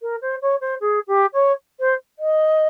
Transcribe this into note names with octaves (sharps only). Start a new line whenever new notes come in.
A#4
C5
C#5
C5
G#4
G4
C#5
C5
D#5